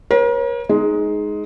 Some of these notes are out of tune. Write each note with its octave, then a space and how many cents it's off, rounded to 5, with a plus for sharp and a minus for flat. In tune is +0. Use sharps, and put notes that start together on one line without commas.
A#4 +40 C#5 -35
G#3 +10 D#4 +5